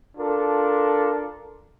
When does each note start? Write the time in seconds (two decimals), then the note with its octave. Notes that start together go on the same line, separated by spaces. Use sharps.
0.18 D4 F4 A4 A#4